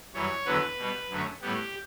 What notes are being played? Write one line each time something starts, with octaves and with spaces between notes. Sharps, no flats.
F#2 E3 G3 C#5
E2 D3 F#3 B3 B4
B2 G3 B3
F#2 D3 A3 C#4
A2 G3 B3 G4